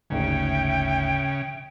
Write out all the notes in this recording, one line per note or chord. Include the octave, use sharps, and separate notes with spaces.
G1 D2 G#2 C#3 E5 G5